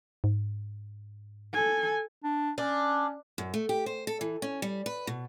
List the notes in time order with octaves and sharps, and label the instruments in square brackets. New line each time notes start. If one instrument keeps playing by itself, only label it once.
[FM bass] G#2
[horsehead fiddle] A4 G#5
[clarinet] D4
[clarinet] C#4 [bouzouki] D4
[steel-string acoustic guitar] F#2
A3
G4
C5
A4
E3
C#4
G3
B4
B2